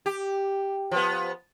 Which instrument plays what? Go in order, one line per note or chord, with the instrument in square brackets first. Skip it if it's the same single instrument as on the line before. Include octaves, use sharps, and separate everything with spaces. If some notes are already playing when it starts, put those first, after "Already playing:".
[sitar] G4
F3 B3